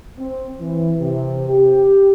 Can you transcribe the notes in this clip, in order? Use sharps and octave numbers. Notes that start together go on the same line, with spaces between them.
C4
E3
C3
G4